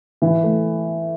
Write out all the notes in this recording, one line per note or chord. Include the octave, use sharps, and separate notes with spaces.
E3
A3